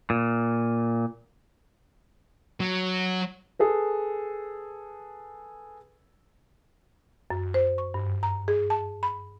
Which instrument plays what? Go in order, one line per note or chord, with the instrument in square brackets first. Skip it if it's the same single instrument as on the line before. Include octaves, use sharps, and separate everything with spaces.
[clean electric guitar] A#2
[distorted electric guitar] F#3
[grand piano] G#4 A4 B4
[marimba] F#2
C5
C#6
G2
A#5
G#4
A5
B5